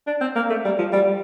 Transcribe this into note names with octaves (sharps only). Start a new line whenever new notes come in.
D4
C4
A#3
A3
G3
F3
G3